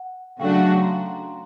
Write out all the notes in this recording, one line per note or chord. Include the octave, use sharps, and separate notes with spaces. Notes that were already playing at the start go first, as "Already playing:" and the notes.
Already playing: F#5
C#3 F#3 A3 D4 F#4 F5 G5
F#5
F5 G5
F#5
A#5 C6